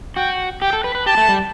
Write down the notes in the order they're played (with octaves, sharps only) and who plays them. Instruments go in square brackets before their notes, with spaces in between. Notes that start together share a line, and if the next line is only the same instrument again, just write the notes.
[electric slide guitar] F#4 [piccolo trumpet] G5
[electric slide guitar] G4 [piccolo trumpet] G5
[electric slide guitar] A4
B4
B4
[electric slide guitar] G4 [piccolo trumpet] A5
[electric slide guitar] A3
G3